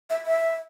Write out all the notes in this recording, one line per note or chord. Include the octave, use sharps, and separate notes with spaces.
E5
E5